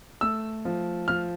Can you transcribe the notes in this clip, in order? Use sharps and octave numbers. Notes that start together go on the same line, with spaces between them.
A3 E6
F3
F3 F6